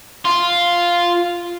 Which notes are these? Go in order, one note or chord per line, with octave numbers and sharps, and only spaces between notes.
F4